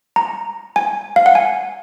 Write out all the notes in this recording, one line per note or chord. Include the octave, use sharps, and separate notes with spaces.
A#5
G#5
F5
F#5
G#5